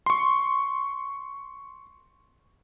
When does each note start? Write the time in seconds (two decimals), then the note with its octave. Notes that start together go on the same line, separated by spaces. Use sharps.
0.06 C6 C#6